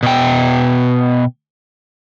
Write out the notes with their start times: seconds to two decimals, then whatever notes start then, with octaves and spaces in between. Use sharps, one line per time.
0.03 B2 G5